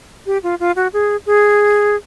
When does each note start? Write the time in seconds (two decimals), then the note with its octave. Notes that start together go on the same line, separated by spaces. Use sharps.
0.26 G4
0.43 F4
0.60 F4
0.76 F#4
0.93 G#4
1.26 G#4